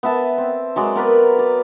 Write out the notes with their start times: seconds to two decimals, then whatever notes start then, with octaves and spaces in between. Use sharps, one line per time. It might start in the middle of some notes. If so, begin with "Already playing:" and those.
0.03 B3 E5 A5
0.38 C4
0.76 F#3 G#3 D5 D#5
0.95 B3 A#4 B4 D5
1.39 D5